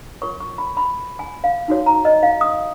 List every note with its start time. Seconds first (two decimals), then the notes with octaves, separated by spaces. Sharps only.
0.22 F4 A#4 C#5 C#6
0.40 C#6
0.58 B5
0.77 B5
1.19 G#5
1.44 F5
1.68 D#4 F#4 C#5
1.86 A#5
2.05 D#5
2.23 F5
2.41 D#6